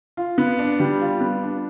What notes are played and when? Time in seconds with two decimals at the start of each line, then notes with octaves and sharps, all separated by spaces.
0.17 F4
0.38 B3
0.59 D4
0.80 G3
1.01 F4
1.21 B3
1.42 D4